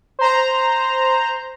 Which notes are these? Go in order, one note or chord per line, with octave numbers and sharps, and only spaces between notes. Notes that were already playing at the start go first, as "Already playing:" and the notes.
C5 A#5